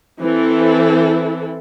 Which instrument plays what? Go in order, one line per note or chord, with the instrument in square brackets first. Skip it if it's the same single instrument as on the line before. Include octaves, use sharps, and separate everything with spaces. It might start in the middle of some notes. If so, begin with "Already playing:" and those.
[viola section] E3 C4 E4 A4